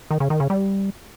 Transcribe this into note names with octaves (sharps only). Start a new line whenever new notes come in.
D#3
C#3
D#3
C#3
G3